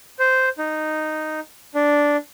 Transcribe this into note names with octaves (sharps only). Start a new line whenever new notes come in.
C5
D#4
D4